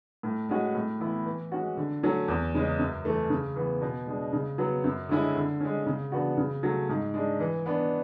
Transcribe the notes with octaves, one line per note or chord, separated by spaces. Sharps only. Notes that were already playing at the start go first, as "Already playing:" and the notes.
A2
G#3 C#4 F#4
A2
E3 B3 E4
E3
G#3 C#4 F#4
D3
F#3 A3 C#4
E2
C#3 G#3 C#4
F#2
E3 A3
C#3
E3 B3
B2
G#3 D4
C#3
F#3 B3
F#2
D3 G#3 C#4 E4
D3
G#3 C#4
C#3
E3 B3 D4 F#4
C#3
F#3 A3 C#4
G#2
G#3 D4
E3
B3 D4